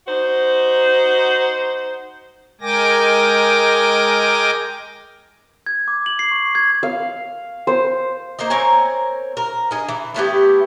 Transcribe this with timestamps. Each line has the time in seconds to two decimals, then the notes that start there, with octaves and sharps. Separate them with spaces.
0.07 D#4 F#4 C5
2.61 G#3 A#4 G5 G#5 D6 A#6
5.66 G#6
5.88 D6
6.06 F#7
6.19 C7
6.31 C#6
6.55 G#6
6.83 F5
7.67 C5
8.39 A#3 C4 D#4 D#5
8.50 C4 A#4 C#5 G#5
9.37 A#4
9.71 D#4 G#4
9.89 E3
10.15 A3 B3 E4 G4